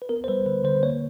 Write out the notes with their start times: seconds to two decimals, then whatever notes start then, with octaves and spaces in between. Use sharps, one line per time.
0.02 B4
0.09 B3 A#4
0.24 C5
0.28 G3 B4
0.46 D3 B4
0.64 D3 C5
0.83 A#3 C#5